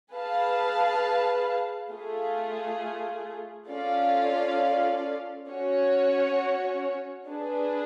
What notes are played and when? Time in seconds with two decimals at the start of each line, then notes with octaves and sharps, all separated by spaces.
0.13 G#4 B4 F5 A5
1.91 A3 F4 G#4
3.70 C#4 F4 A4 D5 F5
5.49 C#4 F#4 C#5
7.28 D4 G#4 B4